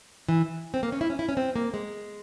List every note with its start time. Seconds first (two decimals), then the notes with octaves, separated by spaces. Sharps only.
0.28 E3
0.74 C4
0.83 A#3
0.92 C#4
1.01 E4
1.10 C#4
1.19 E4
1.29 C#4
1.37 C4
1.56 A#3
1.74 G#3